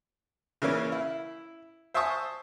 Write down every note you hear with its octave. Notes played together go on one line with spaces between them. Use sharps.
C#3 E3 A#3 C#4
E4
C5 E5 G#5 A5 C#6 D#6